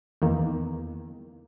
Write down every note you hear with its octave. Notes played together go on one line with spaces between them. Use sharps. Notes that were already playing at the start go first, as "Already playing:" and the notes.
E2 D#3 A#3